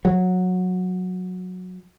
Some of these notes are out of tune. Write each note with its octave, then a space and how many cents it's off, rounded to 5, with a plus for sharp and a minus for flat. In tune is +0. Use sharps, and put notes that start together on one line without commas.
F#3 -15